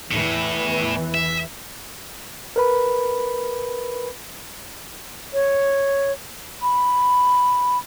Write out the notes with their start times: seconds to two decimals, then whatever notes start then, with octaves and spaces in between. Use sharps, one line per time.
0.11 E2 A2 E3
1.14 E5
2.56 A#4 B4 B5
5.34 C#5
6.62 B5